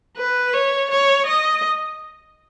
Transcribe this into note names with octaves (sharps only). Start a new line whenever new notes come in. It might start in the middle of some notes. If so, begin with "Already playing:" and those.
B4
C#5
C#5
D#5